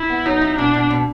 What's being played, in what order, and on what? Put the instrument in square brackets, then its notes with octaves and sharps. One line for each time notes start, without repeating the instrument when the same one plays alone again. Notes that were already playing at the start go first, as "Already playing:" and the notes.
Already playing: [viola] E4
[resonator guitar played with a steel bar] B3
[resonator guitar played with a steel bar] F#3 [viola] D#4
[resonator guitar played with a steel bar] E4
[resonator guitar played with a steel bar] B2 [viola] D4
[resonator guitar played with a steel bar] B2
B2